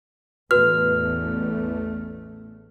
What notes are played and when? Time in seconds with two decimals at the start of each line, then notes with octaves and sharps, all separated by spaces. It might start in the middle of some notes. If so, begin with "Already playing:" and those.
0.51 A1 E2 A3 F#4 B4 F6